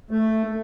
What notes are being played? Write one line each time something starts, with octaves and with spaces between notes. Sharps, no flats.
A3